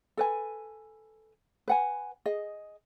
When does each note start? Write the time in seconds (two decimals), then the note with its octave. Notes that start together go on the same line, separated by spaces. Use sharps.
0.17 A4 B4 G#5
1.68 B4 F#5 G#5
2.26 G#4 D#5